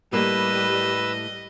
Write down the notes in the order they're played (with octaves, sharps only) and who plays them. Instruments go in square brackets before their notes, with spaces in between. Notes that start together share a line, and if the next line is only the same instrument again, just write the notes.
[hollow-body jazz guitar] A2 A#3 [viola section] G3 [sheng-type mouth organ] B4 E6 [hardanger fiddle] D#5